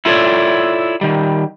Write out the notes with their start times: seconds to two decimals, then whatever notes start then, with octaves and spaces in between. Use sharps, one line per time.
0.05 E4 F4 A4 C#5 D5
1.01 D#3 G3